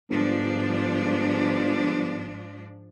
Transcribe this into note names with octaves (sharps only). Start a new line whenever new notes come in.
G1 G#2 F3 D4